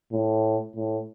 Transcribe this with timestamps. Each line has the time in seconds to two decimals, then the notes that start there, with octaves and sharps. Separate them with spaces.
0.12 A2
0.76 A2